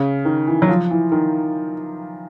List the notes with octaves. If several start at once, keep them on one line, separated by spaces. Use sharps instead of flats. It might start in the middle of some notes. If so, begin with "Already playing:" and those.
Already playing: C#3
D#3
E3
F#3
F3
E3
D#3